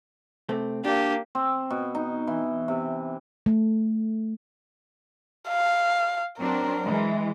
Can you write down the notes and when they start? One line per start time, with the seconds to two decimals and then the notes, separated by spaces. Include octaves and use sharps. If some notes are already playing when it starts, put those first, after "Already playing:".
0.49 C3 A3 C4
0.85 A#3 D4 G4
1.35 C4
1.70 B2
1.95 D#4
2.27 E3
2.68 C3
3.46 A3
5.49 F5
6.39 F#3 C4 D4 A#4
6.85 E3 G#3